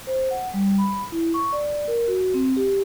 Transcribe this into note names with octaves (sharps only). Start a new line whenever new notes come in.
C5
F#5
G3
B5
E4
C#6
D5
A#4
F#4
C4
G4